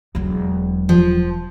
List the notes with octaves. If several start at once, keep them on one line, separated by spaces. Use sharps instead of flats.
E1 F#3
F3